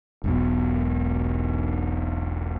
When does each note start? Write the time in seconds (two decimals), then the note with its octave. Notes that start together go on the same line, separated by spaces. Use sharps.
0.24 E1 B1 B2